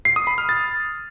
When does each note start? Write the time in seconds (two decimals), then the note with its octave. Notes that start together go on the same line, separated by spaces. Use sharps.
0.05 C7
0.16 D#6
0.27 B5
0.38 F6
0.49 A6